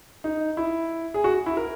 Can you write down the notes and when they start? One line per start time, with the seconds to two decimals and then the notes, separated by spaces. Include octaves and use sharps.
0.24 D#4
0.57 E4
1.14 G#4
1.24 F#4
1.46 E4
1.57 A#4